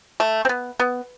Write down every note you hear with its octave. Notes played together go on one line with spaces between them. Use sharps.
A3
C4
B3
B3